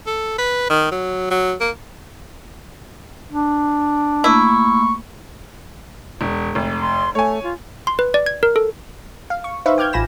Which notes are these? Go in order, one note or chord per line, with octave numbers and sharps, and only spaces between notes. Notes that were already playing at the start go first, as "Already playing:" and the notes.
A4
B4
D#3
F#3
F#3
A#3
D4
A3 A#3 E4 B5 C#6
E1
F1
C6
A3 C#5 G#5
F4
C6
B4
D5
G#6
A#4
A4
F5
C#6
D#4 B4 C5 E5 F5 C#6
G5 D6 F6 G6 G#6
A1 F4 G#5 B5 A#6 E7